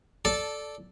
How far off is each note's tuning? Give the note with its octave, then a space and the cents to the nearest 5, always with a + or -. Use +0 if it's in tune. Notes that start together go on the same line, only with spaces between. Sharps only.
A4 -10 D5 +0 A5 +0